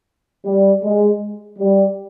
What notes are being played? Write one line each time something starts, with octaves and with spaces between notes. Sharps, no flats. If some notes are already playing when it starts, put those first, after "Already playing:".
G3
G#3
G3